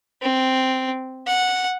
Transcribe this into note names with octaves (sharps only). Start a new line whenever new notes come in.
C4
F#5